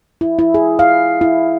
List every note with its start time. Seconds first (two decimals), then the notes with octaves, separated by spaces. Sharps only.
0.21 E4
0.39 E4
0.54 G#4
0.79 F5
1.21 E4